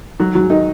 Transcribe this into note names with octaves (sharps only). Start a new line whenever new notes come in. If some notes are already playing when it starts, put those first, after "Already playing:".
D#3 F#3 F#4
F#3 F#4
G#2
D#3 D#4